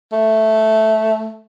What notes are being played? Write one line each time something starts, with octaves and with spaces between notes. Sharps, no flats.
A3